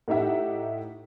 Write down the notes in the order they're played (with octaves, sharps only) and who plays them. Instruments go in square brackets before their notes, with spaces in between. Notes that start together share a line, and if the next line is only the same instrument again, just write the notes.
[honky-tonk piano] A2 D#4 G4 E5 F#5